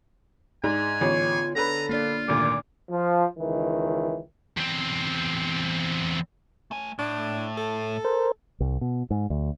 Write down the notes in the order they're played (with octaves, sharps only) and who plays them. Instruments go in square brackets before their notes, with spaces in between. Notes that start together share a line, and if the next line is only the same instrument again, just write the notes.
[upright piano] G#2 [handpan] D#4 G#4 D5 [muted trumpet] G#5
[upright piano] A1 [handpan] D3 B3 C#5 [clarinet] F4
[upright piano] D3 B4 [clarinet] A4 [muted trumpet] A#5
[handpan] A#3 D4 D5 [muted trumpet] F4
[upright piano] G#1 D2 A#2 [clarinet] D6
[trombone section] F3
C#2 D#3 E3
[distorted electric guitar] E2 C4
[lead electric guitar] A3 G#5
[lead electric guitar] A2 [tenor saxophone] D4
[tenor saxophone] A4
[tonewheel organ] A#4 C5
[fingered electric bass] C2
B2
G#2
D2